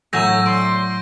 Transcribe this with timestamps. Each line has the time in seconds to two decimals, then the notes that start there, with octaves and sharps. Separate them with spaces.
0.13 A2 F#3 G#5 C#6 E6 G6 A#6
0.46 D5 C6 D7